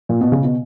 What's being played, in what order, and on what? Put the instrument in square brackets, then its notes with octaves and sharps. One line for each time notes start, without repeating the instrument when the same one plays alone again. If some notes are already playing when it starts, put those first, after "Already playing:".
[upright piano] A#2
B2
C#3
B2